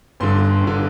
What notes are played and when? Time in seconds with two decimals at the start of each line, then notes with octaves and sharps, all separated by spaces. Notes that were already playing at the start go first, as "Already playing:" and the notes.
0.20 G1 G2 D3 C6
0.63 G1 D3